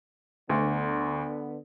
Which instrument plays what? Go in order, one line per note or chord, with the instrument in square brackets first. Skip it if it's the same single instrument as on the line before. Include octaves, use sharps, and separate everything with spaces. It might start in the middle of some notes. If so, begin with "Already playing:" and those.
[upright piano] D2 [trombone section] D3 B3